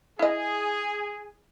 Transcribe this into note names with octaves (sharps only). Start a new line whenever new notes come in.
E4 G#4 D#5